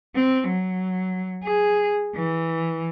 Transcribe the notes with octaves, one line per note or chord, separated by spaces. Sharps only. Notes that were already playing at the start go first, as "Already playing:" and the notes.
C4
F#3
G#4
E3